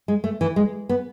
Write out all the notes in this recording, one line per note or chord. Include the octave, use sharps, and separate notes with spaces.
G#3
A3
E3
G#3
B3